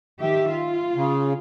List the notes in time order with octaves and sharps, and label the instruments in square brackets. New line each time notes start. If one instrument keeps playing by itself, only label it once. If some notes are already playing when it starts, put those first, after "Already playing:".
[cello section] D#3 G4 E5
F4
[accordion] C#3